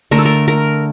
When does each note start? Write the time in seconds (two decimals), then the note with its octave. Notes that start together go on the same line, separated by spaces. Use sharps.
0.11 D3 A3 A#4
0.18 A4
0.25 A#4
0.48 A#4